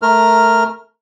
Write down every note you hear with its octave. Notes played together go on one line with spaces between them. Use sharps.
A3 A#4 F6